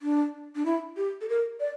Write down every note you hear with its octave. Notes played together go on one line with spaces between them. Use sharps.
D4
D4
E4
G4
A4
A#4
D5